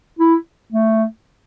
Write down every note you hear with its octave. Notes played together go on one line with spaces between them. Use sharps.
E4
A3